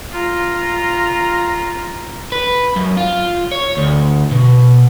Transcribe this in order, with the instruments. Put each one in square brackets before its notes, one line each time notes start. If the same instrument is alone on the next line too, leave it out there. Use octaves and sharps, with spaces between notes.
[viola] F4 A#5
[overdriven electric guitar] B4
F#2
F4
C#5
D2
B2